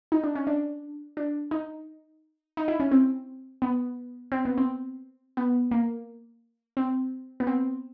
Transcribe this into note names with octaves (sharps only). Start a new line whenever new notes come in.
D#4
D4
C#4
D4
D4
D#4
D#4
E4
C#4
C4
B3
C4
B3
C4
B3
A#3
C4
B3
C4